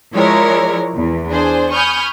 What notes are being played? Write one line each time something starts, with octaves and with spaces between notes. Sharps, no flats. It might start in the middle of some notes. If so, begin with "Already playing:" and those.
F3 G#3 E4 A#4 C#5 D5
E2
D4 G#4 C5
G#5 B5 C#6 D#6 F6 G6